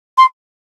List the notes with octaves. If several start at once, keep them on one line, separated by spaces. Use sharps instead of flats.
C6